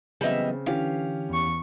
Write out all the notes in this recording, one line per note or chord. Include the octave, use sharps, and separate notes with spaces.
C#3 E3 F#3 G3 B3 C4 D#5 E5
D3 E3 C#4 G4 F5
E2 C#6